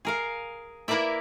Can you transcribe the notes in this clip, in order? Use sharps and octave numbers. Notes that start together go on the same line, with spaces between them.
G#4 A#4 F5
A#3 E4 A#4 B4 D5 E5